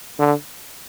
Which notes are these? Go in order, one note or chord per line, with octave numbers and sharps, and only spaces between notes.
D3